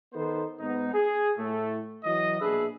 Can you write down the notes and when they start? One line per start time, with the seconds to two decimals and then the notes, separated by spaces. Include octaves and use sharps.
0.14 D#3 B3 D#4 A4 C5
0.59 G#2 B3 D#4
0.94 G#4
1.37 A2 A3
2.04 E3 F#3 D#5
2.41 A#1 B2 D4 G#4 B4 E5